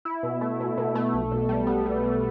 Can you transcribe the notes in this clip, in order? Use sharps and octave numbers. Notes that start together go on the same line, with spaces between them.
E4
B2
A3
B2
B2
A3
B1
B2
G3
B3
G3
G3